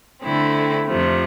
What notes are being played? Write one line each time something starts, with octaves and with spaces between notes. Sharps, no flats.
D3 A3 C4 E4
F2 C3 F3 A3